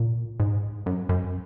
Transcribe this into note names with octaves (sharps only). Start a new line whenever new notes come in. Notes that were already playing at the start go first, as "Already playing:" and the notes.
Already playing: A#2
G#2
F#2
F#2